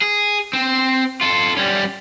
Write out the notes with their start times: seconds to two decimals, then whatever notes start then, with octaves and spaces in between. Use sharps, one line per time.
0.01 G#4
0.53 C4
1.21 F4 A4
1.57 G3 C#4